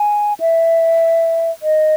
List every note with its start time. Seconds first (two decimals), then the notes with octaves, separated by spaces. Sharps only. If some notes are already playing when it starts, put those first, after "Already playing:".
Already playing: G#5
0.40 E5
1.62 D#5